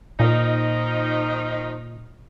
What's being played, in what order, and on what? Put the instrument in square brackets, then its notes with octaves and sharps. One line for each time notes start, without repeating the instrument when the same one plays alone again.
[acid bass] A#2 [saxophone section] D#3 F3 D#4